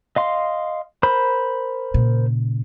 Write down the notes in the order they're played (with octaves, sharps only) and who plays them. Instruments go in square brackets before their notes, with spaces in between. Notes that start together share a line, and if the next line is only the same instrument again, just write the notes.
[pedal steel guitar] D#5 F5 C6
A#4 C5 B5
[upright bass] A#2 C#3